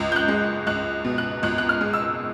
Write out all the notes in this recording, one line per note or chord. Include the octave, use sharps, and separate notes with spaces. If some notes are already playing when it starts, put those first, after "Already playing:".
Already playing: C#2
G6
F#6
G#3
C#2 F#6
B2
F#6
C#2 F#6
F#6
F6
G#3
E6